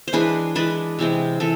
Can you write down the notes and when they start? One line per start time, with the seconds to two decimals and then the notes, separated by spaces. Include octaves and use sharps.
0.08 C5
0.13 E3 G#3 D4 G#4 B4
0.55 E3 G#3 D4 B4 D5
0.99 C3 E3 G#3 C4
1.40 C3 E3 A4